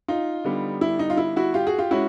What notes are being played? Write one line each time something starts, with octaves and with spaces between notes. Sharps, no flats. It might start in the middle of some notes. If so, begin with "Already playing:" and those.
D#4 F4
D3 G3 B3
E4
D#4
F4
E4
E4 F#4
F4 G4
F#4 G#4
F4 G4
G#3 C#4 E4 F#4